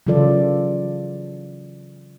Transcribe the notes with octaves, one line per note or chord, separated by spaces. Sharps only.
C#3 E3 F#3 F4 A4 D5